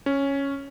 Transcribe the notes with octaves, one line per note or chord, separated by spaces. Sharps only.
C#4